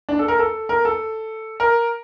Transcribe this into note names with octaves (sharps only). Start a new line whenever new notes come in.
D4
A4
A#4
A4
A#4
A4
A#4